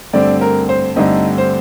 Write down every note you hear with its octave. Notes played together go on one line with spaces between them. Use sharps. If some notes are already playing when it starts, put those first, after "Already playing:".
G2 D3 A3 C4 D4 D5
A#4
C5
G2 D3 A3 C4 D#4 D#5
C5